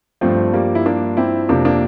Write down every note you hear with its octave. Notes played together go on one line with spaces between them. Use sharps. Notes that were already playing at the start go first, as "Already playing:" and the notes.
G2 F3 A3 C4
G3 A#3
E4
A#3 D4
C4 E4
F2 C3 F3 A#3 D4
A#3 D4